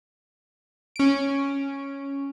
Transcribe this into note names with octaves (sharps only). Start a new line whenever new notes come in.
C#4 D7